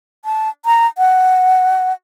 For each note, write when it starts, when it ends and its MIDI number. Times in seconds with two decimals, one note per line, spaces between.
0.25 0.49 81
0.65 0.87 82
0.98 1.93 78